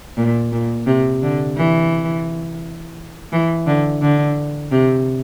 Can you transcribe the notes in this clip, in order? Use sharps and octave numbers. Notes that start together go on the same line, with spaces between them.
A#2
A#2
C3
D3
E3
E3
D3
D3
C3